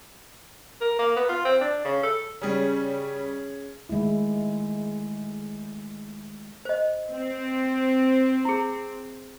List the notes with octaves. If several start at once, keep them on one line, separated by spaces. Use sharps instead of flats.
A#4
A#3
B3
F4
C4
D4
C#3
A4
C#3 G3 C#4 G#4
D#3 G#3 A3 E4
C5 D#5
C4
E4 G#4